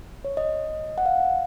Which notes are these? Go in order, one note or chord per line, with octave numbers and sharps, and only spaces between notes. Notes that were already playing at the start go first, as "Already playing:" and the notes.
C#5
D#5
F#5
F5